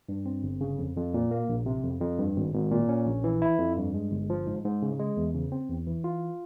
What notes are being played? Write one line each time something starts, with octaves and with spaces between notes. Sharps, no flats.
G2
C4
G1
C#3
F2
F2
A#2
A#3
A#1
C3
F2
F2
G2
G#1
G#1
A#2
C#4
A#1
E3
E4
F2
G2
G#3
G1
F3
G#2
G#2
C#3
G#3
E2
C#3
C4
E2
E3
F4